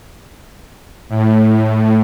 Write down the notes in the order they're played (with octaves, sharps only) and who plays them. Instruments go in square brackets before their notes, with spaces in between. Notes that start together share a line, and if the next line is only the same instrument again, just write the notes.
[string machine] A2